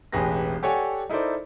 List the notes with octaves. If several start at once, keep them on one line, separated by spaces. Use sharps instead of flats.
E1 A1 G4 G#4 B4 A#6
G4 A4 C#5 D5 F#5 G#5
D#4 E4 A4 A#4 C5 D5